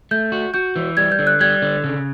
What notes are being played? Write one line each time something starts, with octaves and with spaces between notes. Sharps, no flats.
A3 G6
F#4
F#4 G6
E3
G3 G#6
G6
D3
F#6
G3 G#6
D3
C#3